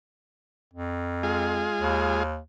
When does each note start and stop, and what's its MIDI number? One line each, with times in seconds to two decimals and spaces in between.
0.74 1.68 41
1.23 2.23 56
1.23 2.23 65
1.23 2.23 68
1.79 2.39 39